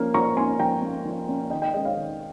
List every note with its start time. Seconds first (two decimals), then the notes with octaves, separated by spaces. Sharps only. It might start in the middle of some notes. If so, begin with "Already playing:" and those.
Already playing: F3 A#3 C#4
0.14 F3 A#5 C#6
0.37 A#3 C#4 G#5 C6
0.59 F3 G5 A#5
0.82 A#3 C#4
1.05 F3
1.28 A#3 C#4
1.50 D#3 D#5 G5
1.62 D#5 G5
1.74 G#3 C#4 D#5 G5
1.85 C#5 F5
1.97 D#3